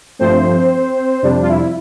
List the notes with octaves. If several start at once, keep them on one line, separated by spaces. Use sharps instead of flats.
G2 F3 A3 C4 C5
F2 C3 G3 D4
F4
E4